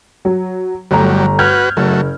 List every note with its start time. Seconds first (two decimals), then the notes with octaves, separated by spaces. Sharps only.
0.25 F#3
0.91 G1 F#3 G3 A3 A#5
1.39 F#4 B4 F6 G6 G#6
1.77 F#1 F#3 A3